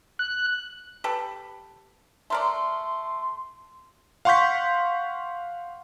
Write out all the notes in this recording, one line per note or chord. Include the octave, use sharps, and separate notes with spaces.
F#6
G4 A4 B4
A3 A#4 D5 C6
F5 F#5 C6 C#6 G6 B6